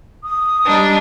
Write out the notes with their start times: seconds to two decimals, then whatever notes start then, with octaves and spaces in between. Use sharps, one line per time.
0.24 D#6
0.65 G3 D4 D#4